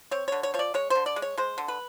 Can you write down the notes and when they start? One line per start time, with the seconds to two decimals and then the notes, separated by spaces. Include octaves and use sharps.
0.11 C4 C#5
0.28 D3 C#5
0.43 C#5
0.54 F3 C#5
0.59 D5
0.74 G#3 C#5
0.90 D3 C5
1.06 D5
1.16 G#3
1.22 C#5
1.38 G#3 C5
1.58 D3
1.68 B4